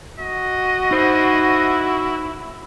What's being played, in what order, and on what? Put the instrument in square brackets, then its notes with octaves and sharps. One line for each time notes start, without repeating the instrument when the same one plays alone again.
[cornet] F#4 [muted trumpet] D#5
[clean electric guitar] D#4 C5 [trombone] E4